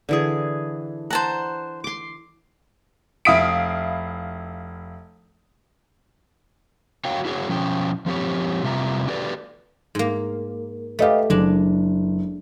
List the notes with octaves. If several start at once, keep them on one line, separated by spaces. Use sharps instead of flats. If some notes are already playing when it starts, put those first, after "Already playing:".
D3 E3 G#4
C5 F#5 A5 A#5
C6 D6
F1 E4 F5 D#6 B6 D7
F#4 C#5 F5 G5
E4 F#4 G#4 C#5
B2 F3 C#4 G5
F3 C4 G4 C#5
C3 G3 F4 E5 G#5 A#5
F#4 G4 A4 B4 D5
G#2 A#3
A3 G4 B4 D#5 F5
F#1 G#3 D4